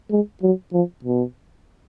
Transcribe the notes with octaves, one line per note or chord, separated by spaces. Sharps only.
G#3
F#3
F3
B2